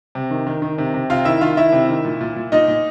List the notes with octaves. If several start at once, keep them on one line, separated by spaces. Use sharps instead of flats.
C3
D#3
D#3
D#3
C3
C3
C3 F4 F5
D#3 E4 E5
D#3 F4 F5
D#3 E4 E5
C3
D#3
A#2
A#2
A#2
A#2 D#4 D#5
A#2